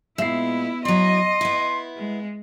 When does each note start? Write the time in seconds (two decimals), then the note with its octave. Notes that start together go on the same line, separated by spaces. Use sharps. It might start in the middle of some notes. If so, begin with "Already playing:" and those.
0.18 A#2 G#3 B3 E4 E5 C7
0.85 F#3 E4 D#5 C6
1.41 B3 E4
1.97 G#3